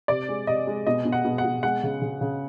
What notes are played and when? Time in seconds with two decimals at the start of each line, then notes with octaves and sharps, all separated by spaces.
0.08 C3 D5
0.29 G#3
0.47 C3 D#5
0.67 G#3
0.87 B2 D#5
1.05 B2
1.12 F#5
1.25 B2
1.38 F#5
1.45 B2
1.63 G#3 F#5
1.83 C#3
2.02 C#3
2.21 C#3